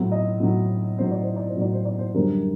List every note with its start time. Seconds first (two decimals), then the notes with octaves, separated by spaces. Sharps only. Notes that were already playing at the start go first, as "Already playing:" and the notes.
Already playing: A2 F#3 C4
0.12 D#5
0.40 A2 F#3 C4
0.98 A2 F#3 C4 C5
1.11 D5
1.23 C5
1.36 D5
1.48 C5
1.56 A2 F#3 C4 D5
1.73 C5
1.85 D5
1.99 C5
2.14 F#2 D3 G3 C4 A#4